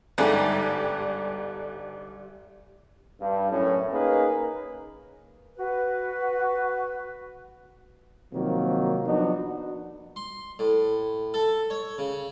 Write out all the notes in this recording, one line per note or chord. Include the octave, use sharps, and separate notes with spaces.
G1 G#2 G3 A4 G#5 F#6
G2
F#2 A2 C#4
A#3 C#4 D#4 G#4 A#4 B4
F#4 B4
C3 D#3 F3 F#3 A#3
F3 F#3 B3 D4 D#4 F#4
C6
A2
A4
C#5
C#3